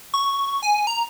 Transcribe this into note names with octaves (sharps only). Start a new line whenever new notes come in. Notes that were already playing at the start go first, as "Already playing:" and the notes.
C#6
G#5
A#5